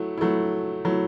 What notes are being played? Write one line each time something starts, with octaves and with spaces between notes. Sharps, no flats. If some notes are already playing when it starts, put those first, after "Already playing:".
Already playing: F#3 A3 E4
F#3 A3 E4
F#3 A3 E4